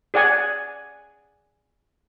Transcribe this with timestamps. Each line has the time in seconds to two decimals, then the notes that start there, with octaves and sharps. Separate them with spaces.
0.14 G#4 D5 F#5 G#5